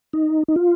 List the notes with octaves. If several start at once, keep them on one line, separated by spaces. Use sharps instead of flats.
D#4
D#4
F4